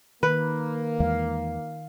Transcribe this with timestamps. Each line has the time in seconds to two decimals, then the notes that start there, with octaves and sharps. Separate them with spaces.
0.23 D#3 A#3 B4
1.00 E2 E3 G#3 F5